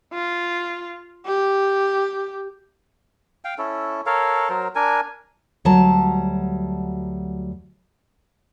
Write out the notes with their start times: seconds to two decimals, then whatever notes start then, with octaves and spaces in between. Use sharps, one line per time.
0.13 F4
1.26 G4
3.45 F5 G5
3.58 C#4 E4 A4
4.06 A4 A#4 C#5 F5
4.49 F#3 A#4 C5
4.75 D4 A#4 G#5
5.65 D2 F#3 G3 A5 A#5